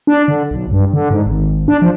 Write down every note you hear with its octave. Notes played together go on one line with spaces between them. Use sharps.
D4
D3
B1
G2
D3
G#2
G#1
D4
F3